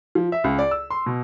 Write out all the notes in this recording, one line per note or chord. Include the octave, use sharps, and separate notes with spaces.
F3
E5
C#2
D5
E6
C6
B2